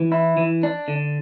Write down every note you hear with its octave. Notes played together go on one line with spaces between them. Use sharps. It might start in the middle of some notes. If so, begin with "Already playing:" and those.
Already playing: E3
E4
E3
D4
D3